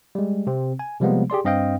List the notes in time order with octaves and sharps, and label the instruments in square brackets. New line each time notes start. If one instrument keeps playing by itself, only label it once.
[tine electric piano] G3 G#3
C3 C4
G#5
C3 F3 G3 G#3 A#3 B3
G4 G#4 D5 C6
G2 C4 D#5 F5 G5